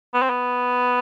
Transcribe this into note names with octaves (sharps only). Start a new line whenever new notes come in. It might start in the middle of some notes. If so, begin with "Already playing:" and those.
B3
C4
B3